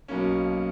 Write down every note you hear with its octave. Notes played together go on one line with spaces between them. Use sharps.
B1 B2 A#3 C#4